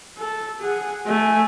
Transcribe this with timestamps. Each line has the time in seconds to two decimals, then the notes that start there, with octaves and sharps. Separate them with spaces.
0.18 A4
0.60 G#4 F#5
1.06 A3 G#5